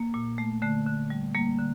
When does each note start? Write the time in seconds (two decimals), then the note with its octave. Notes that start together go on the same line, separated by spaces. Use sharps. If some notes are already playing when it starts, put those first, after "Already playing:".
Already playing: A#3
0.14 A#2
0.38 A3
0.62 D3 A3
0.86 D3
1.10 G3
1.34 G3 A#3
1.59 D3